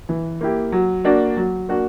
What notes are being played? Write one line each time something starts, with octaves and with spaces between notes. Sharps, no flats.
E3
A#3 E4 G4
F#3
A#3 D4 F#4
F#3
A#3 D4 F#4